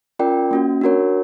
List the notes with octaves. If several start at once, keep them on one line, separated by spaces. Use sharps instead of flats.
C#4 F4 A#4 D5 G5
A#3 C#4 F#4
D4 F#4 A#4 C#5